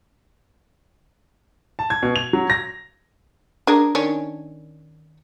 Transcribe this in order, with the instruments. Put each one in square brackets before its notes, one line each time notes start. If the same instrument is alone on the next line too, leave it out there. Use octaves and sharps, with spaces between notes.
[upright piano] A5
G#6
B2
F7
F#3
A#6
[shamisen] D4 G#4 A#4
D#3 C#4 D4